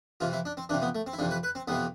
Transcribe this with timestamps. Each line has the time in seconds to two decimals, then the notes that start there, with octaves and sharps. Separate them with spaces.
0.20 F2 C3 E3 F4
0.33 E4
0.45 D4
0.57 C4
0.69 F2 C3 E3 D4
0.82 B3
0.95 A3
1.07 C4
1.13 E4
1.19 F2 C3 E3 D4
1.31 B4
1.43 B4
1.55 C4
1.68 F2 C3 E3 B3